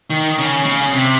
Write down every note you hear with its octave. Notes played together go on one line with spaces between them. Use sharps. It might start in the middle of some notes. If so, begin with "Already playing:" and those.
D#3
C#3
C#3
C3